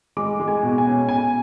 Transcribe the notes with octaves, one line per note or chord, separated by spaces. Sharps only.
G#3 D6
G#3
G#5
B2
G#5
C#4
B2 G#5